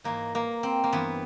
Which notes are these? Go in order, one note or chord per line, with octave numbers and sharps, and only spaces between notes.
G#2 E3 A#3
A#3
C4
A#3
G2 E3 B3